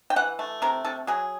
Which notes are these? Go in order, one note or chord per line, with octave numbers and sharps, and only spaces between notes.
G5
E3 F#5
A3
C3 A#4
C3 A4
F#3 G#4